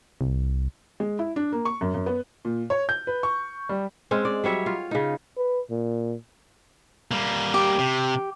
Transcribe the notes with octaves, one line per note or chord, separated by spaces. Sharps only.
C2
G#3
E4
D4
A#3
C#6
F#2
F#2
B3
A#2
C#5
G6
B4
C#6
G3
G#3 C4 C#4
D5
F#3 G3 C#5 E5
F4
C#3 D#4
B4
A#2
G3 A#3
G4
C3